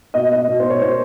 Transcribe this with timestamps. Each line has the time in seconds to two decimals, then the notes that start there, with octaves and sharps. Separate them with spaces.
0.14 B2 D#5
0.32 D#5
0.48 B2
0.60 C5
0.70 C#5
0.82 B2 C5